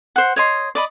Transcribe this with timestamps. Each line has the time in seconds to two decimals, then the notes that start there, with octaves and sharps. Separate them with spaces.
0.16 C5 F#5
0.36 C#5 D#5 C6
0.75 D5 D#5 B5